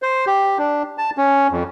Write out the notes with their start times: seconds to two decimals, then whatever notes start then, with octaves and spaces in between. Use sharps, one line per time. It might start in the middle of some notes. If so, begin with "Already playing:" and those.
0.02 C5
0.27 G4
0.58 D4
0.98 A5
1.18 C#4
1.51 F2